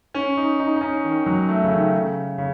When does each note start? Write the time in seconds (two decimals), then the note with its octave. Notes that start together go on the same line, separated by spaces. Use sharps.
0.14 C#4
0.37 D#4
0.59 D#4
0.76 D#4
0.81 C#4
1.04 D#3
1.26 F#3
1.48 A3
1.64 C#3
1.71 D#3
1.94 C#3
2.38 C#3